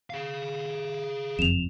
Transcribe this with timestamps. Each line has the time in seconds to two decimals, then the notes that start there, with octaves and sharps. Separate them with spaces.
0.10 G#4 F5
1.39 F#1 F2 E7 F7